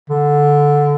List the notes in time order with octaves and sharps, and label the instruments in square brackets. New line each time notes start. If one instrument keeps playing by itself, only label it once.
[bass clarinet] D3